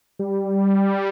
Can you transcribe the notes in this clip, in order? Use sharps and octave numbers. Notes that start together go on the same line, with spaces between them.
G3